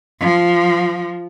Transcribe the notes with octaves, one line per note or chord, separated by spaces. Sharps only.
F3